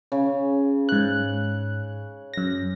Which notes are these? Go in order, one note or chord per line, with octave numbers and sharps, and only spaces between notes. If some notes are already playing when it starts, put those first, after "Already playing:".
C#3
G#2 C#5 F#6
F#2 A#6